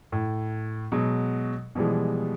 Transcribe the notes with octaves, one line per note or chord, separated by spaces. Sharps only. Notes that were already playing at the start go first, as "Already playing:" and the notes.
A2
B2 F#3 G#3
B2 E3 F3 G3 G#3